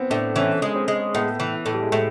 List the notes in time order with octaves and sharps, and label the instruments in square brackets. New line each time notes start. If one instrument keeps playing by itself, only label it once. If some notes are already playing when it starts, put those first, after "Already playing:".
Already playing: [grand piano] B3 C4
[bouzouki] A2 [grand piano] D4
[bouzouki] E3 [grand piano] C#4
[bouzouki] G#3
[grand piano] C4
[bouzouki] G#3
[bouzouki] A2 [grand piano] B3
[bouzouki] E3
A2
[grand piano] G3
G#3
[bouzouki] A2 [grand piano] A3